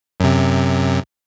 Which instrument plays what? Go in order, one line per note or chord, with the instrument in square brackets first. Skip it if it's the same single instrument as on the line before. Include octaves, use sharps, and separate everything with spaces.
[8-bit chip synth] F#2 C3